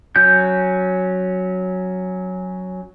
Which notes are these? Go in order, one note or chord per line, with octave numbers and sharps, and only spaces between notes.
F#3 C#4 G6